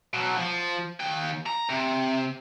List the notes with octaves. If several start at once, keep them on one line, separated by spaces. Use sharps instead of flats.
B2 F#3
F3
D#2 G5
A#5
C3